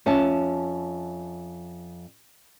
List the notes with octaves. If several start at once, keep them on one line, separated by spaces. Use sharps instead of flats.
F2 C#4 E5 A5